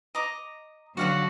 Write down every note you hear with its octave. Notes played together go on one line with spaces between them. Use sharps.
D#5 A#5 D6
D3 F#3 F#4 D5 F5 F#5